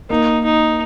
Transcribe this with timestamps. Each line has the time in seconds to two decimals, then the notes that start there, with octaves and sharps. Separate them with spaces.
0.10 A#3 D#4
0.45 D#4